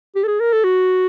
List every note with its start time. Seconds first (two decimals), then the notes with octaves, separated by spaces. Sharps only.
0.15 G4
0.24 A4
0.28 G#4
0.40 A#4
0.52 A4
0.64 F#4